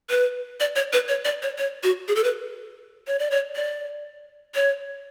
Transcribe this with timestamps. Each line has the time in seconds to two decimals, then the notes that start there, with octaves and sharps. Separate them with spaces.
0.10 B4
0.60 D5
0.76 C#5
0.93 B4
1.08 C#5
1.25 D5
1.42 C#5
1.58 C#5
1.83 F#4
2.08 G#4
2.16 A4
2.24 B4
3.07 C#5
3.19 D5
3.31 C#5
3.56 D5
4.55 C#5